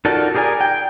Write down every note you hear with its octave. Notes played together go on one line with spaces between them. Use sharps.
D#4 F4 F#4 A4 A#4 D5
G4 G#4 A#4 D5 G#5
G5